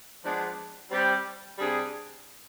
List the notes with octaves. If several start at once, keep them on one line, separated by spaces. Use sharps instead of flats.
F3 G#3 B3 D4
G3 C4 G4
C3 G3 D4 G#4